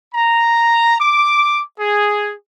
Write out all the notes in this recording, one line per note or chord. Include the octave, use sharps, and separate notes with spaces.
A#5
D6
G#4